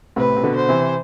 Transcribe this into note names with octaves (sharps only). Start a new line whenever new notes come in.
A2 C3 B4
C3
B2 D3
C5
C3 E3